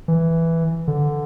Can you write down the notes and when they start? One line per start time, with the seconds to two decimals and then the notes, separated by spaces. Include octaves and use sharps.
0.08 E3
0.88 D3